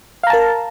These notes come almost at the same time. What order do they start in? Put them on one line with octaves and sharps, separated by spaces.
F5 A#5 A5 A#4